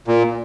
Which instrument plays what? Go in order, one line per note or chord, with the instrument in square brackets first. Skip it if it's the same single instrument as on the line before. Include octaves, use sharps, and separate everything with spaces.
[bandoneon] A#2